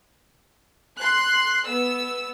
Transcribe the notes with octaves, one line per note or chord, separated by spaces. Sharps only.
C6 F#6
B3 E6